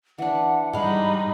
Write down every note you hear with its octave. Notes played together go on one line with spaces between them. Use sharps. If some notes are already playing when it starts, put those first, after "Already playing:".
E3 D4 F#5
G#2 G3 G#3 D#4 F5 B5